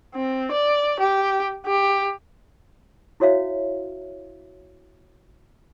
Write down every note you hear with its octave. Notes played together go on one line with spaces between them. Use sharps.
C4
D5
G4
G4
E4 F#4 C#5 E5 F5